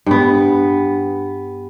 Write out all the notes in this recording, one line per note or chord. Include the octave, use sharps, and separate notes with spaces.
G2 B3